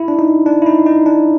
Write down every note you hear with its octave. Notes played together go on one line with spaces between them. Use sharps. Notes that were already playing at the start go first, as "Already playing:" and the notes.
Already playing: E4
D4
D#4
D4
E4
D#4
D#4
D4